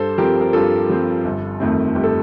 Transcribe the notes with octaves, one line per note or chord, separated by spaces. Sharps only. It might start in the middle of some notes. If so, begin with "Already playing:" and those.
Already playing: G2 A4 C5
F3 C4 G4 A#4
A#4
G2 F4 A4
F3 C4
G1
F2 D#3 A3 C4
G1 G4
A4